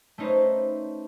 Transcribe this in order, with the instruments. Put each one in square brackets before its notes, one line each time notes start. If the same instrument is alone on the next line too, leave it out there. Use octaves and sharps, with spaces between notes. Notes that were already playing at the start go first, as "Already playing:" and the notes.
[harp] A3 C#4 D#4 B4 C5